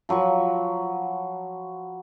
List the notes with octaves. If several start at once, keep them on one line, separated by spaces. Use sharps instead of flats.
F3 F#3 B5 C#6